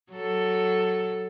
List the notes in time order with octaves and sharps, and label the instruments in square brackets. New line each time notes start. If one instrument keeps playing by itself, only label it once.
[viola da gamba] F#3 A4